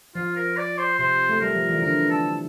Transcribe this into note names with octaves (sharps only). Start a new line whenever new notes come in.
F3 F4
A#4
D5
C5
C3 C5
A3
G3 A#4
F3
E3
D3 A#4
A4